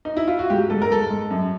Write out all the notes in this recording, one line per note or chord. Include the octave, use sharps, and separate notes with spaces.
D#4
E4
F4
F#4
G#2 G4
G#2 A4
A#4
G#2 A4
G#2
F#2